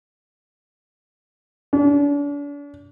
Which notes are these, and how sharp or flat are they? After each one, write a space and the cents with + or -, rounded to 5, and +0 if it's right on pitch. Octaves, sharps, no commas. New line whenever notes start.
D4 -40